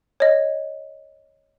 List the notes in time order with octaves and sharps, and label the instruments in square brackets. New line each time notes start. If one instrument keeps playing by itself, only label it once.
[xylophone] C#5 D#5